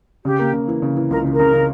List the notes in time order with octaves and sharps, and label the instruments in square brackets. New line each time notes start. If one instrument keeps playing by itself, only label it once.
[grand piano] C#3 [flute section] G4
[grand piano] A#3
C#3
E3
C#3
E3
[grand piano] C#2 [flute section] A#4
[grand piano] C#3
[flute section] A#4
[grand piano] C#3
C#3